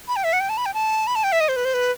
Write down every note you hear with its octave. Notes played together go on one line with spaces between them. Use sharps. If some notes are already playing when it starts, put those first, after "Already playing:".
B5
G5
E5
F#5
G5
A5
B5
G5
A5
B5
A5
G5
E5
D#5
C5
B4
C5
B4